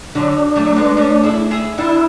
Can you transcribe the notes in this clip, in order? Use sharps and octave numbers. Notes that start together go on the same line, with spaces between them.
D3 F#3 D4
F#3 A3
G#3 B3
A3 C#4
E4 G#4
E4 G#4
D4 E4 F#4